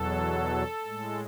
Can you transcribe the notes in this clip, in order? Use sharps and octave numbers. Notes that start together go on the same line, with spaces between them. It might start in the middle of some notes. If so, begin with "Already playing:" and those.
Already playing: E2 B2 F#3 A4
A2 G#3